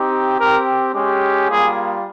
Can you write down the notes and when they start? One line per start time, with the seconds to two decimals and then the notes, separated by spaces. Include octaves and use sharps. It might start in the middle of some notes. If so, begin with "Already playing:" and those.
Already playing: C4 D#4 G4
0.39 C4 G4 A#4
0.94 G#3 C#4 G4
1.49 G3 A#3 F4 G#4